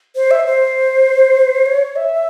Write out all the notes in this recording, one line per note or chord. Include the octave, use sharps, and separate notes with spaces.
C5
E5
C5
C#5
E5